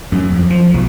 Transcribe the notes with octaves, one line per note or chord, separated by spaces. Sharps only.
F#2
F2
F3
B1